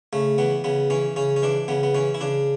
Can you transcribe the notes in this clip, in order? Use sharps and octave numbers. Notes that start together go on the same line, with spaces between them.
C#3 A3
E3 B3
C#3 B3
E3 C#4
C#3 C#4
C#4
E3 D4
C#3 B3
B3
E3 C#4
E4
C#3 D4